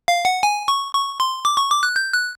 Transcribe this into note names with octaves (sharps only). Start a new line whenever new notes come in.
F5
F#5
G#5
C#6
C#6
C6
D6
C#6
D6
F#6
G6
F#6